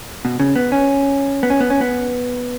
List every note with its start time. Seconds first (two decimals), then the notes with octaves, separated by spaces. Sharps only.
0.25 B2
0.40 C#3
0.56 B3
0.72 C#4
1.43 B3
1.50 C#4
1.61 B3
1.70 C#4
1.81 B3